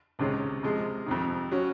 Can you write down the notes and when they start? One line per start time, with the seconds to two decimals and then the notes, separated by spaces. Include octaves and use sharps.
0.19 C#2 C3 D#3 G#3 C#4
0.63 C3 F3 G#3
1.06 F2 C3 D#3
1.51 F#3 C#4